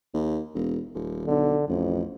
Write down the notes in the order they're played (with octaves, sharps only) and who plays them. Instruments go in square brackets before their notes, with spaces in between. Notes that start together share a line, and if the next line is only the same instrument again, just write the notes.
[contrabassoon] D#2
E1
D#1
[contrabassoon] B1 [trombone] D3
[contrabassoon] A1 [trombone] F2